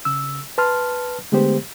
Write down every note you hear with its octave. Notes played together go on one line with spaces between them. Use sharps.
C#3 E6
B4 A5 C6 F6
D3 G#3 A3 B3 G4 C5